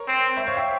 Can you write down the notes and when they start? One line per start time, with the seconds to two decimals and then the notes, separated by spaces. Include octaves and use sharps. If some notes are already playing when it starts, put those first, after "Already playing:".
Already playing: A#4 C#5
0.08 C4
0.37 C5 E5
0.47 C#5 F5
0.57 E5 G5